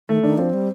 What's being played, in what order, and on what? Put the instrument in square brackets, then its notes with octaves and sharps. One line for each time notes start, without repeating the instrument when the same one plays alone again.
[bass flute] D#3 [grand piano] A3
[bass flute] D#3 [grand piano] D4
[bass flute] F3 [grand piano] C4
[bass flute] G3